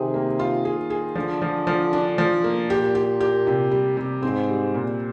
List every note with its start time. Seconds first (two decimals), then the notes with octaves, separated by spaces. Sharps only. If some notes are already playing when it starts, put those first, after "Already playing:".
Already playing: C3 D#3 G#4
0.14 A#3
0.39 F4
0.65 G#4
0.90 G#4
1.15 D3 F3
1.42 F3
1.67 F3
1.93 D4
2.18 F3
2.44 A#3
2.70 A#2 G4
2.95 G4
3.21 G4
3.47 C3
3.71 G3
3.97 C3
4.22 G#2 C4
4.49 G3
4.74 A#2